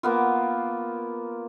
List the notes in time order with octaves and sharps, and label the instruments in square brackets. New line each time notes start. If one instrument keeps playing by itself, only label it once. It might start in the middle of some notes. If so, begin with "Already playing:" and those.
[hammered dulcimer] A#3 B3 F4